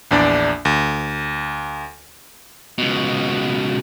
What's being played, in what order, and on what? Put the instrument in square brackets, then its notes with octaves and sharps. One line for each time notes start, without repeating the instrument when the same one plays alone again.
[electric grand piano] A#1 E2 D4 D5
D2
[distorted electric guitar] C#2 B2